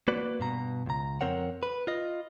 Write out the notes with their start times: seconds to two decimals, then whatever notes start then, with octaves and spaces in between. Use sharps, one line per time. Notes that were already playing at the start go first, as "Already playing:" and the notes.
0.08 A#3 F#4 B4 D5
0.40 G2 B2 A#5
0.86 C#2 A#5
1.21 F2 C4 A#4 C#5 F#5
1.63 B4
1.87 F4 D#5